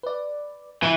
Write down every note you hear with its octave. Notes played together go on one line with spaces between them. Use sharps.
B4 D5
E3